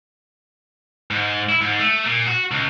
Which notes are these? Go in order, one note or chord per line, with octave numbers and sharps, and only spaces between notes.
G#2
E4
G#2
A3
A#2
F#4
C#2